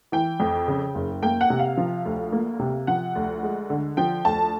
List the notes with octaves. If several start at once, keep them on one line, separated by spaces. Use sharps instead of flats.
E3 G5
F2
C#3
F#1
A#3 G5
F#5
C3
F5
F3
D2
A#3
C3
F3 F#5
D2
G#3
D3
F3 G5
D2 A5